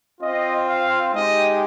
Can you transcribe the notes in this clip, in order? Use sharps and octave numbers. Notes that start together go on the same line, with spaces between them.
C4 F4 D#5
F5
G#3 D#4 G4 D#5